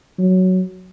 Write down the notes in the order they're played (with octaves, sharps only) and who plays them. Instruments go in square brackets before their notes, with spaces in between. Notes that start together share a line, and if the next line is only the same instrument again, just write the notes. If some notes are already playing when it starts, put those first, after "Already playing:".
[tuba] F#3